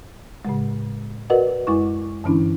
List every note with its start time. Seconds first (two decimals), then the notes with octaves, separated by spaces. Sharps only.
0.45 A2 C#3 G#3
1.30 F#4 A#4 B4 D5 D#5 F#5
1.67 F#2 G#3 E4 C#6
2.24 G2 D3 E3 C#4 D4 E4